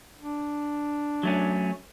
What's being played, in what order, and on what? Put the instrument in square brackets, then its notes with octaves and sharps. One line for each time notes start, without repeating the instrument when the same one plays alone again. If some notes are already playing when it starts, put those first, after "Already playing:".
[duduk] D4
[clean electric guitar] F#3 A3 C#4